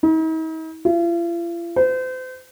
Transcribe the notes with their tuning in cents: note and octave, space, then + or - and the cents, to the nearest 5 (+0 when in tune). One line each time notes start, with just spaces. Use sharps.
D#4 +45
F4 -45
C5 -35